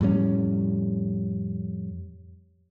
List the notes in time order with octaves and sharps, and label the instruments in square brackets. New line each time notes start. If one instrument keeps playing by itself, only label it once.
[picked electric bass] F2 A2 G3 C#4